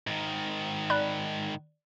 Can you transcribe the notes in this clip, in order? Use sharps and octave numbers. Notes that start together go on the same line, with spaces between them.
G#2 D#3
D5 B5 F#6